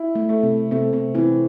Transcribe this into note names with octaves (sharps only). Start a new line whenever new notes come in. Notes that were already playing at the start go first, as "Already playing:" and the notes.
Already playing: E4
A3
A3
C3 C4
C3 A3 C4
C3 C4
C3 E3 C4